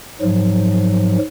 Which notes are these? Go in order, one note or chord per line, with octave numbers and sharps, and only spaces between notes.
G#2 F3 F#3